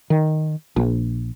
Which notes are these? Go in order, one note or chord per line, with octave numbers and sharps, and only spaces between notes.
D#3
A#1